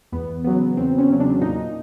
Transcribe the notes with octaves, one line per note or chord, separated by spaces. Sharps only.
E2 B3
C#3 F#3 B3
E2 C4
C#4
C#3 F#3
D4
A#2 D#4